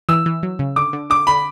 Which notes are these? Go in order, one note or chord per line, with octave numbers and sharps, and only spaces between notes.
E3 E6
E3
F#3
C#3
D3 D6
D3
D3 D6
D3 B5